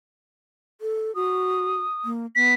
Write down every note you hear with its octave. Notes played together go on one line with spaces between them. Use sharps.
A4
F#4 D#6
A#3
B3 B6